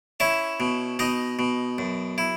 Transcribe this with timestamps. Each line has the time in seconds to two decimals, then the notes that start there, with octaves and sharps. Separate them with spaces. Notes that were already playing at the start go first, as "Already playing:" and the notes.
0.20 C#4 E4 E5
0.60 B2
0.99 B2 D#4 D#5
1.39 B2
1.78 F#2
2.18 E4